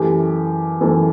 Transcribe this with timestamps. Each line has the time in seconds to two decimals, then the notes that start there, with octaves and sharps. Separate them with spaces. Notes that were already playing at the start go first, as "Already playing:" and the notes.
Already playing: F#2 E3 A3 G4
0.81 F#2 E3 A3